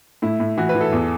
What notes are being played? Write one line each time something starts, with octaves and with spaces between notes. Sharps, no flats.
A2 E4
A2
E3 F#4
B4
E3
A4
E2